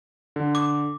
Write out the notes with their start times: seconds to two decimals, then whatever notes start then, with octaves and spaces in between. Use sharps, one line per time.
0.36 D3
0.55 D6